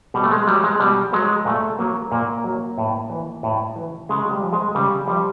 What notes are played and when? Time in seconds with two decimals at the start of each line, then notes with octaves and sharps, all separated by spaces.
0.14 B2 G3
0.24 A3
0.31 G#3
0.47 F#3 G3
0.64 G#3
0.80 B2 G3
1.13 F#3 G#3
1.45 A#2 A3
1.79 F#3 A#3
2.11 A#2 A#3
2.44 F#3
2.78 A2
3.10 E3
3.43 A2
3.76 E3
4.09 C#3 G#3
4.31 G3
4.42 F3
4.53 G#3
4.75 C#3 G3
5.08 F3 G3